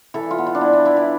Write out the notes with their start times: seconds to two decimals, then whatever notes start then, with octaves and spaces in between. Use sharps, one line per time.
0.14 E3 A4
0.31 F4
0.38 B3
0.47 F4
0.55 D4
0.61 B3 E4
0.73 D4
0.85 E3 E4
0.96 E4